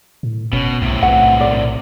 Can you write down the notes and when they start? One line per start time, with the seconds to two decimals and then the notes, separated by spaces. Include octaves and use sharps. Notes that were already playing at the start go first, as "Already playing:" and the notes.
0.23 A2
0.53 F#1 B2 C#4
0.82 B1 A2 C3
1.03 B1 B4 F#5
1.40 A#4 D5